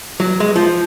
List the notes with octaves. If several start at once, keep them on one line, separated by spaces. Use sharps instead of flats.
F#3
G#3
F3